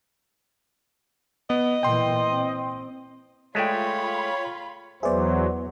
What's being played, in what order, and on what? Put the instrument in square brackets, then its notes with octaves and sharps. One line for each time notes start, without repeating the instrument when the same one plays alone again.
[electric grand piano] B3 [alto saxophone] D#5
[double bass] A#2 E3 [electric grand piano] G5 C6
[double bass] C4
[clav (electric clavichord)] G#3 A3 D5 [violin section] F4 B5 [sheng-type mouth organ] C#5 [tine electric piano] G5 B6
[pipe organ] E2 F#3 [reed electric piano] B3 B4 E5 [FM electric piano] G#4 D5 [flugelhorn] C5